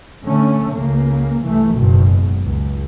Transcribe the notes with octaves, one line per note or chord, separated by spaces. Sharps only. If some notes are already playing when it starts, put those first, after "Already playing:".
D3 A3 C#4
C#2 C#3 A#3
C2 E3 A3
F#1 B1 G#2 B2
C#2